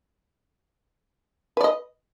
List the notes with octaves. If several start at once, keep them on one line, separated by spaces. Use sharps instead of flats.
B4 D5 D#5